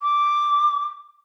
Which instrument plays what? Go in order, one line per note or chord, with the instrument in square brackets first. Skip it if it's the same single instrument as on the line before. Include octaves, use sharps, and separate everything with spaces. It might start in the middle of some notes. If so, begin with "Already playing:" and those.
[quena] D6